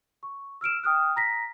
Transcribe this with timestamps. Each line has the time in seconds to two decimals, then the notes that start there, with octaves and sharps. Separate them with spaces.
0.23 C#6
0.61 E6 F6 D7 E7
0.83 G5 D#6 F6 F#6
1.16 A#5 A#6 B6